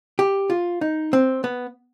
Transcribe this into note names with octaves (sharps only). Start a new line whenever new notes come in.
G4
F4
D#4
C4
B3